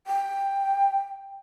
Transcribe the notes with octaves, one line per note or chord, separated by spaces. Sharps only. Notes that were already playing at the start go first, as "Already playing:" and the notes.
G5